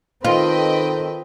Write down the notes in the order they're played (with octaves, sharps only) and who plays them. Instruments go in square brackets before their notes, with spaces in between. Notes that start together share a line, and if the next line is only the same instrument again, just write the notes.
[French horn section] D#3 A4 [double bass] C4 [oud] F4 [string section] B4 D#5 G5